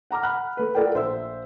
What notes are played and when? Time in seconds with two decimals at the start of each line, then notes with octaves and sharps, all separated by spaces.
0.11 F#5 A#5 D6 F6
0.23 F#5 B5 F6 F#6
0.57 A3 B4
0.75 F4 A4 A#4 D5 F#5 G5
0.94 A#1 C5 E5 E6